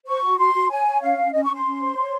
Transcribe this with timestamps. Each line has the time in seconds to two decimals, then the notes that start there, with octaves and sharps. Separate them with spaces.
0.07 C5 C#6
0.22 F#4
0.39 F#4 C6
0.54 F#4
0.70 C#5 G#5
0.87 C#5
1.02 C#4 F5
1.17 C#4
1.33 C#4 D#5
1.44 C#4 C#6
1.55 C6
1.65 C#4
1.81 C5
1.96 C#5